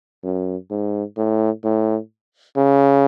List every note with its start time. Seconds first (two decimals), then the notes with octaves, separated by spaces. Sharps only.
0.24 F#2
0.71 G#2
1.17 A2
1.64 A2
2.57 C#3